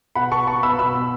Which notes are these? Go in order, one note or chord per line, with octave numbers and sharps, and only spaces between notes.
B2 F#5 B5
B2 A5 C#6
B2 A5 C#6
B3 B5 E6
B2 B5 E6
B2